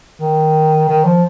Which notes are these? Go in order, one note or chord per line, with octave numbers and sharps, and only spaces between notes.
D#3
D#3
F3